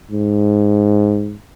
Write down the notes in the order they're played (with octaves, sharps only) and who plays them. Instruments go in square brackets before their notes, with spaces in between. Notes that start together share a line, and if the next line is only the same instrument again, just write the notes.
[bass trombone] G#2